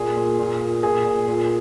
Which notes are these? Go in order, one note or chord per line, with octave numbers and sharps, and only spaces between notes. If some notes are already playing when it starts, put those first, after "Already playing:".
Already playing: A#2 G#4
A#2
A#2
A#2
A#2 G#4
A#2
A#2